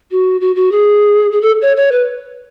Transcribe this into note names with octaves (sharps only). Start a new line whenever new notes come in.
F#4
F#4
F#4
G#4
G#4
A4
C#5
C#5
B4